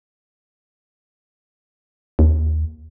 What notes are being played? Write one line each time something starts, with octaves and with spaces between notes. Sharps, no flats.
D#2